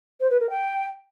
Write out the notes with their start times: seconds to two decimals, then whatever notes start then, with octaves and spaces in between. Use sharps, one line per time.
0.20 C5
0.30 B4
0.40 A#4
0.50 G5